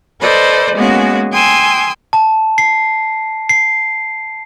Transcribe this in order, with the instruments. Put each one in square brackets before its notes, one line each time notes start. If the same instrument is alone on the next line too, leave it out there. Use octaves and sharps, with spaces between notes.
[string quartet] A4 B4 C5 D5 D#5
G#3 A#3 B3 C#4 F#4
G5 G#5 C6 D#6 E6
[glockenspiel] A5
C7
C7